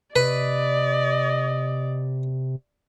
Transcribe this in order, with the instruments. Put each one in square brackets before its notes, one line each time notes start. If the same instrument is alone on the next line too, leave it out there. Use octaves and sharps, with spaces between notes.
[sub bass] C3 [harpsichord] B4 [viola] D5 [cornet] D#5